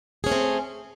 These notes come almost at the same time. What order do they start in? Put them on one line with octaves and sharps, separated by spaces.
G#4 C#4 A3 C4